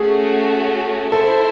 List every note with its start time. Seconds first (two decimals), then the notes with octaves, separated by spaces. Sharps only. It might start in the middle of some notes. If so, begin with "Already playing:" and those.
Already playing: A3 C#4 F#4 G#4
1.12 E4 A4 C5 E5